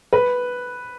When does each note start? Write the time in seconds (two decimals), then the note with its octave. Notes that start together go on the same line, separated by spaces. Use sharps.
0.13 B4